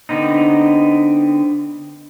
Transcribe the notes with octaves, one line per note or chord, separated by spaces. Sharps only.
D3 B3 C4 D#4